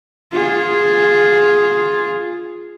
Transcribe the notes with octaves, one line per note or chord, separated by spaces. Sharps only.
F4 G#4